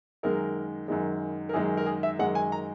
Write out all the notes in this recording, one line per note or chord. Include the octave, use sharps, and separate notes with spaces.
F#2 D#3 G#3 A#4
F#2 D#3 G#3
A#4
F#2 D#3 G#3 G#4
A#4
G#4
E5
F#2 D#3 G#3 F#5
G#5
A#5